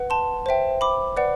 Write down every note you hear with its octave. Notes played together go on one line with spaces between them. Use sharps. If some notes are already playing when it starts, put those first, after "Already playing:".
Already playing: B4 F#5
A5 C6
C5 E5 G5
B5 D6
B4 D5 F#5